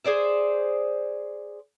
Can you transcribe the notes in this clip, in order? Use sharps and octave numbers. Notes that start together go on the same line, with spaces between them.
G#4 C5 D5 E5